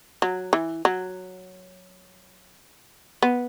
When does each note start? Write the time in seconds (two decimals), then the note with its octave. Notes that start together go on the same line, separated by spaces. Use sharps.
0.22 F#3
0.53 E3
0.85 F#3
3.22 B3